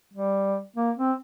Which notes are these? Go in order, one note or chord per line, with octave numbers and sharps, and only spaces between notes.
G3
A#3
C4